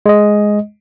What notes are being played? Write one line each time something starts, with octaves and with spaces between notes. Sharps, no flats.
G#3 D#5